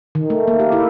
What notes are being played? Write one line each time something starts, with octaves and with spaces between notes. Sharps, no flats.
D#3
A3
A#3
G4
E4